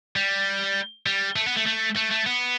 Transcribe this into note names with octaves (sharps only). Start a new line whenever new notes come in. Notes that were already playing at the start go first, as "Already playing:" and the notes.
G3
G3
A3
B3
A3
A3
A3
A3
B3